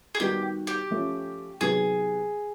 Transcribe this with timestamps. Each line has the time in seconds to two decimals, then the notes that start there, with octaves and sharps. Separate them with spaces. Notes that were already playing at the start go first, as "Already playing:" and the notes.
0.15 G#4
0.20 D#3 G3 B3 D#4 F#4 G4
0.67 G4
0.91 F3 A3 C#4
1.61 C3 D#3 F#3 B3 G#4